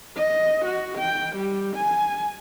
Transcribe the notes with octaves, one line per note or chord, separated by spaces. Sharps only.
D#5
F#4
G5
G3
G#5